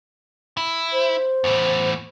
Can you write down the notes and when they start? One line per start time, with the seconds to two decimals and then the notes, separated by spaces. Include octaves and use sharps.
0.57 E4
0.93 C5
1.44 E2 A2